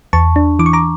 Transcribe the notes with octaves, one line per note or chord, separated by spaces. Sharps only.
E2 A5 C#6
D4
E3 D6
C#6
A#5 D6